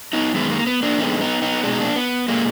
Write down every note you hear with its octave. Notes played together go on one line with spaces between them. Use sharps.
B3 D#4
F#2 D#3 G#3 B3
A#3
B3
A#3 D4
F2 D3 G#3 B3 D#4
B3 D#4
B3 D#4
B2 G#3 D4
D#4
A#3 D4
B3
A#2 G#3 A#3